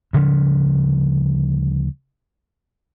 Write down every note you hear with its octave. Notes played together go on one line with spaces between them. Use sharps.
D2 C#3 F3 G3